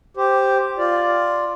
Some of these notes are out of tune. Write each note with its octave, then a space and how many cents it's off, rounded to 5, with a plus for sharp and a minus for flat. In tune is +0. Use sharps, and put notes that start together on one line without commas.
G4 +0 C5 +0
F4 +0 D5 +0 F5 +0